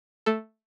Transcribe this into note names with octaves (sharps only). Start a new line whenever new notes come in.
A3 A4